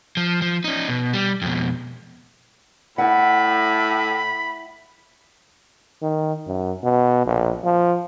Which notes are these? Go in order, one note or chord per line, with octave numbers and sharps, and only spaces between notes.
F3
F3
C#4 D#4
B2
G3
F2 B2
A2 E4 F#5 B5
D#3
F#2
B2
A#1
F3